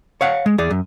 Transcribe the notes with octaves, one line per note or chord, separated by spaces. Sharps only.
C#5 F5 F#5
G#3
E2 G#4 D5
F#2